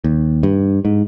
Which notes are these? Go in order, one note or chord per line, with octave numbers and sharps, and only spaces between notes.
D#2
G2
G#2